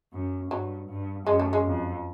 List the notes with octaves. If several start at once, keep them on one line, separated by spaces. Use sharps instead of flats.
F#2
G2 F#3
G2
F#2 G#3
A3
G#3
F2